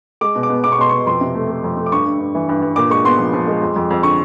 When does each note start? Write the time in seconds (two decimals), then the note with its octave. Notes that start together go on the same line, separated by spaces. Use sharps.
0.21 G#3 D6
0.35 B2
0.43 D6
0.50 B3
0.64 B2 D6
0.72 C#6
0.78 B2 C6
0.89 B2 C#6
1.06 F2 C6
1.21 C3
1.35 A3
1.49 A3
1.64 F2
1.77 A3
1.86 D6
1.92 G2 C#6
2.06 G2
2.20 G2
2.35 E3
2.49 G2
2.62 G2
2.76 A#2 D6
2.90 G#3 C#6
3.05 B3 C6
3.18 F3
3.33 F3
3.47 G#3
3.62 F2
3.76 F2
3.90 F2
4.03 D3 C#6